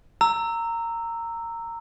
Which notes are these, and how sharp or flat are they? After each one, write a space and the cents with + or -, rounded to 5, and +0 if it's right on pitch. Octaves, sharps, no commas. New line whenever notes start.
A#5 -15 E6 +0